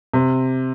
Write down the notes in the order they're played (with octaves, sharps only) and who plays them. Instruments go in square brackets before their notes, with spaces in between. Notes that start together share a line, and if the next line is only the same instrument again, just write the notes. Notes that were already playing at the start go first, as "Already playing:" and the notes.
[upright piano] C3